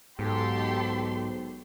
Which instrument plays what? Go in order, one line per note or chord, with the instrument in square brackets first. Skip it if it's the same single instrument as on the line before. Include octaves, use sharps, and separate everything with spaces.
[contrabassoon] B1 [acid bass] G#2 [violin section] G4 A4 C6